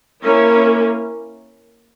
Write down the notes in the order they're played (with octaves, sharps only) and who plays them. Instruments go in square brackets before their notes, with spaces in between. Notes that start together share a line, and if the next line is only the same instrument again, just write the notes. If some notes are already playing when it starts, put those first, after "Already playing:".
[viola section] A#3 C#4 E4